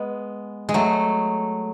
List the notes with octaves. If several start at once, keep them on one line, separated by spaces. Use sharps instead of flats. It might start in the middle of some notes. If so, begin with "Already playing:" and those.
Already playing: G#3 B3
G#3
F#3 A3